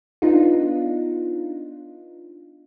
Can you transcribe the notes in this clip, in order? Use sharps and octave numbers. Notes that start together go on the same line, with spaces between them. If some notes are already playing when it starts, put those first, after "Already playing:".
B3 D4 D#4 F4